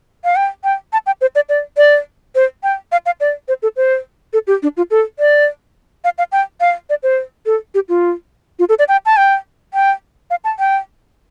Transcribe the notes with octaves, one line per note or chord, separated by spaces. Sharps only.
F5
G5
G5
A5
G5
C5
D5
D5
D5
C5
G5
F5
F5
D5
C5
A4
C5
A4
G4
D4
F4
A4
D5
F5
F5
G5
F5
D5
C5
A4
G4
F4
F4
A4
D5
G5
A5
G5
G5
F5
A5
G5